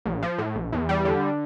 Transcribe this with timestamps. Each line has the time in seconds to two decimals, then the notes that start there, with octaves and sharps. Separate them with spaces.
0.05 A#1
0.23 F3
0.38 A2
0.55 A#1
0.72 E2
0.89 G3
1.05 D3